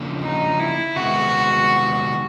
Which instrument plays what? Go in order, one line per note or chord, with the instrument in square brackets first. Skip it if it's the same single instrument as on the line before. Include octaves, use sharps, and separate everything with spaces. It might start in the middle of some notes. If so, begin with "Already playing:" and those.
Already playing: [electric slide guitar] C#3 F3 A#3 D4
[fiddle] D#4
E4
[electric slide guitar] C3 D#3 G#3 B3 [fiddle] F#4